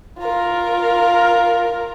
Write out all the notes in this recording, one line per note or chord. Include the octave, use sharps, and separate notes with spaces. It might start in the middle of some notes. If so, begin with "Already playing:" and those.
F4 A#4